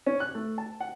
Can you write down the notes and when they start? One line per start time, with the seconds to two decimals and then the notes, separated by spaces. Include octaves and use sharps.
0.06 C#4
0.20 F#6
0.35 A3
0.58 A5
0.80 F#5